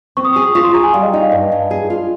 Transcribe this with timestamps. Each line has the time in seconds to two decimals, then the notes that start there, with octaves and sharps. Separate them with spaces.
0.17 C4 C#6
0.25 D#6
0.33 C#6
0.36 G#4
0.55 F4 C#6
0.64 C6
0.74 G#4 A#5
0.83 G#5
0.93 G3 F5
1.03 D#5
1.13 D#4 D#5
1.22 F5
1.32 G2 D#5
1.52 G2
1.71 G#4
1.90 F4